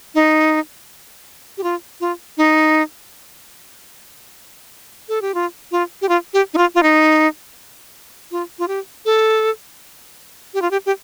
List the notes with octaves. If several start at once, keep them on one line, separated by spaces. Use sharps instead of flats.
D#4
G4
F4
F4
D#4
A4
G4
F4
F4
G4
F4
G4
D#4
F4
F4
D#4
F4
F4
G4
A4
G4
F4
G4
G4